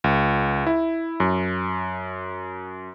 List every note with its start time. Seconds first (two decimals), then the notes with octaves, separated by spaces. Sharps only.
0.04 C#2
0.67 E4
1.20 F#2